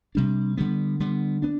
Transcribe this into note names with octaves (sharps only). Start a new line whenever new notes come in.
C3 G3 D4
D3 G3 B3
D3 G3 B3
B3 D4